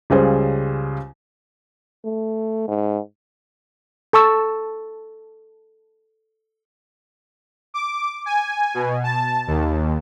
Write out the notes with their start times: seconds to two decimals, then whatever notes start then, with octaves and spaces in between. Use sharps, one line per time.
0.10 C#2 C#3 G3 G#4 C5
2.05 A3
2.68 G#2
4.13 A4 A5 C#6 E6
7.74 D6
8.26 G#5
8.74 B2
9.03 A5
9.47 D#2